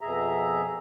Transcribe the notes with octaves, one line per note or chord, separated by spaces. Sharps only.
F2 B2 G#4 E5 A#5